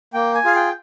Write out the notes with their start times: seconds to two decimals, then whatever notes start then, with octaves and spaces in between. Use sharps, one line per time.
0.14 A#3 G5
0.35 G#5
0.45 F4 G#4 F5
0.56 G5